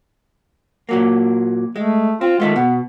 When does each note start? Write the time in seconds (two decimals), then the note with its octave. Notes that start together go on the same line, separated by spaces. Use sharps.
0.89 A#2 F#3 A#3
1.76 G#3 A3
2.21 C4 F4
2.40 D#3 G#3 A3 F4
2.56 B2 B3